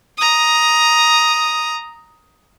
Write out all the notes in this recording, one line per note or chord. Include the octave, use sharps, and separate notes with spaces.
A#5 D#6